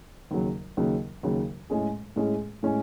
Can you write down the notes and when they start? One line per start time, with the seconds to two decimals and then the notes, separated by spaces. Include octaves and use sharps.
0.31 D#2 C#3 F#3
0.77 D#2 C#3 F#3
1.23 D#2 C#3 F#3
1.70 A2 G#3 C#4 G#4
2.16 A2 G#3 C#4 G#4
2.63 A2 G#3 C#4 G#4